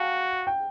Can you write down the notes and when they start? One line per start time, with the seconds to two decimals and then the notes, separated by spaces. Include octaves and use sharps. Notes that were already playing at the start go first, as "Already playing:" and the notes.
Already playing: F#4 F5 G5 A5
0.47 G5